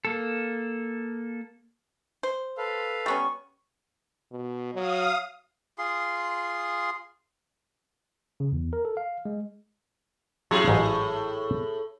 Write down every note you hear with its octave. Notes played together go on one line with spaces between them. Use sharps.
A#3 A4
C5
A4 B4 F5
G3 B3 C#4 C#6
B2
F#3 F5 D#6
F4 G#4 C6
C#3
E2
A#4
A4
F5
G#3
A2 F#3 C#4 E4 G4 G#4
A1 G#2 F#3